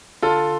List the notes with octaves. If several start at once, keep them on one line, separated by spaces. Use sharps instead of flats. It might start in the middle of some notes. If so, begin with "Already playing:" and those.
D3 F4 A4